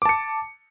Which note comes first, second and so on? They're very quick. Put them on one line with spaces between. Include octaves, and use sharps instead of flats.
D6 A5 C#7